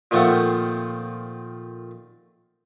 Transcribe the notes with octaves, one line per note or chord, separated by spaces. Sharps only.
A#2 D#3 F3 A3 C4 F#5